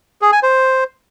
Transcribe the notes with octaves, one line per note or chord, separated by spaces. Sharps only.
G#4
G#5
C5